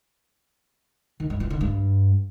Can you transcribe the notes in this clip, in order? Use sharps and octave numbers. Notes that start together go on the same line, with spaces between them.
D#3
G2
E3
D3
G2